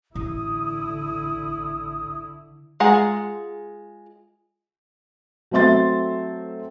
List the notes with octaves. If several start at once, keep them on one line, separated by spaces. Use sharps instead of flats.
A1 D3 E4 D#6
G#3 F4 G#4 F#5 A#5
F#3 A3 C4 E5 C6 A6